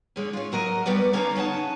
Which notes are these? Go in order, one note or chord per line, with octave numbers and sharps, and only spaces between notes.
D3 G#3 C#4
C#4 F4
F#3 F#4 A#4 D#5
G3 B3 F#4 B4 D5
D3 C#4 F5 F#5 A#5
C#3 C#4 D#4 F#5 A5